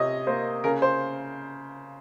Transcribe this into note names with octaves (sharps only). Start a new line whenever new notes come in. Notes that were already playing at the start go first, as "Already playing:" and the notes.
Already playing: C3 C#5 D#5
A#3 C5
C#3 A#4
C5